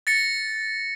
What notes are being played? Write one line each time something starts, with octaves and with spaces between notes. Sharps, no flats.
A6 A#6 C#7